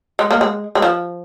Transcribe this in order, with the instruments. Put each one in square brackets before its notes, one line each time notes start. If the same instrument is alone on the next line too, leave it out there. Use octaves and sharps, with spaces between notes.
[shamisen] G#3
A#3
G#3
G#3
F3